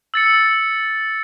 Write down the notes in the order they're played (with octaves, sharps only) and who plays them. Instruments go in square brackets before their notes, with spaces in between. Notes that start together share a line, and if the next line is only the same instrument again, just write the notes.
[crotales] E6 A6 C#7